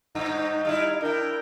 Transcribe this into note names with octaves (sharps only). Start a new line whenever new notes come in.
G2 D#4
G3 E4 F5
D4 E4 A#4 G5